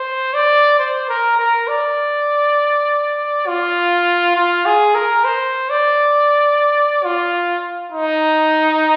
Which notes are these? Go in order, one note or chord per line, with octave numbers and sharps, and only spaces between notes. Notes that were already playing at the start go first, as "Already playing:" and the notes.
Already playing: C5
D5
C5
A#4
A#4
D5
F4
F4
G#4
A#4
C5
D5
F4
D#4